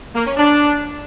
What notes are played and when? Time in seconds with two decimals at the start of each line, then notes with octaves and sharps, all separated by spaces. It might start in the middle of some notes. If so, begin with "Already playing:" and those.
0.15 A#3
0.26 C#4
0.37 D4